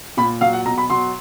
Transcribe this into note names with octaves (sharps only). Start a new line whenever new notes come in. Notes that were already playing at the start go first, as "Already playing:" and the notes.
A#2 B5
F#3 F5
F#5
B2 A#5
B5
F#3 C6